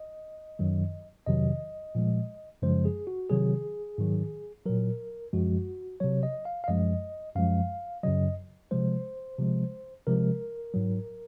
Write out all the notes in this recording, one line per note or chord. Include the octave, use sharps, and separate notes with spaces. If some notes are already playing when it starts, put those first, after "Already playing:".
Already playing: D#5
F#2 D#3 F#3
F2 C3 D#3 F#3 D#5
A#2 F3 G#3
F#2 C#3 F3 G#3 C5
G#4
F#4
C3 D#3 F#3 G#4
G#2 D#3 F#3
A#2 F#3 A#4
F#2 F3 G#3 F#4
C3 F#3 C#5
D#5
F5
F5
F#2 F3 G#3 D#5
F#2 F3 G#3 F5
F#2 C#3 F#3 D#5
C3 F3 G#3 C5
C3 F3 G#3
C3 F3 G#3 A#4
G#2 F#3